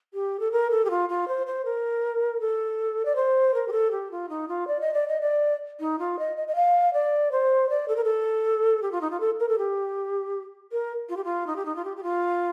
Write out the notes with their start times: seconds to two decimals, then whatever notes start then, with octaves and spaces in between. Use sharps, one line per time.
0.14 G4
0.40 A4
0.52 A#4
0.71 A4
0.85 G4
0.90 F4
1.09 F4
1.28 C5
1.47 C5
1.65 A#4
2.40 A4
3.05 D5
3.16 C5
3.54 A#4
3.68 G4
3.72 A4
3.91 G4
4.11 F4
4.29 D#4
4.48 F4
4.68 D5
4.81 D#5
4.94 D5
5.08 D#5
5.21 D5
5.80 D#4
5.99 F4
6.19 D#5
6.37 D#5
6.48 D#5
6.56 F5
6.93 D5
7.32 C5
7.70 D5
7.88 A4
7.96 A#4
8.04 A4
8.82 G4
8.92 F4
9.01 D#4
9.11 F4
9.20 A4
9.40 A#4
9.49 A4
9.58 G4
10.72 A#4
11.09 F4
11.17 G4
11.24 F4
11.47 D#4
11.56 G4
11.65 D#4
11.76 F4
11.85 G4
11.97 G4
12.03 F4